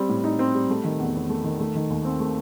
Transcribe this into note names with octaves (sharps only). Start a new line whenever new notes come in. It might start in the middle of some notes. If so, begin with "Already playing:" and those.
Already playing: G3 C4
A2
D#4
C4
G3
A3
D#3
E2
E2
A3
D#3
A3
D#3
D#2
C4
A3